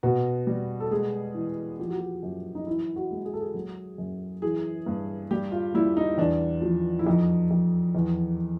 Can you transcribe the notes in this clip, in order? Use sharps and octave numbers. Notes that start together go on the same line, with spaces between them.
B2 F#4
G3
A4
G#3 G#4
E3
F3 G4
F#4
G4
F#2
D#4
E3 E4
F#4
G#3
G#4
A4
G#4
F#3
F#2
E3 G#4
G2
G3 G4
F4
G3 E4
D#4
E2 D4
F3
E4
F2 D#4
F2
E2